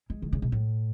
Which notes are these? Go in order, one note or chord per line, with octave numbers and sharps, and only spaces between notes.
G#3
D#3
C#3
B2
A2